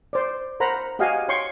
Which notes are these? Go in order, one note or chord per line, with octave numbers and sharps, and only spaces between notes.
C5 D5
A#4 C5 F#5 A#5 B5
F#4 G4 D#5 F5 F#5 G#5
C#5 G5 C6 C#6